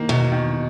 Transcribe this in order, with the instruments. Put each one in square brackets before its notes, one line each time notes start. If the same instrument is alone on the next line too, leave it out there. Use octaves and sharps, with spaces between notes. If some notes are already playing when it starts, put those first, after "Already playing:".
Already playing: [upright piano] D#3 A#3
[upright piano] E2 [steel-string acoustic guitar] B2
[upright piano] D#3